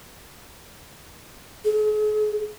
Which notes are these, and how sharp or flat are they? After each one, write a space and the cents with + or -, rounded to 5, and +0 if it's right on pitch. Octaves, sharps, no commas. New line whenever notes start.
G#4 +45